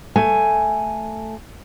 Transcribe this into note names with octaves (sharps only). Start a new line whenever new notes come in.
A3 G#5